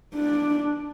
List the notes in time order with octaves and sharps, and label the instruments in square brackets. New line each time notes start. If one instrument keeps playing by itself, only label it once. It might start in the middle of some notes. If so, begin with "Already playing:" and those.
[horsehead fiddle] D4